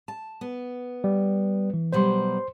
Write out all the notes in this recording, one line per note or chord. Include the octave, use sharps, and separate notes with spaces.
A5
B3
G3
E3
B2 F#3 G3 C5 C6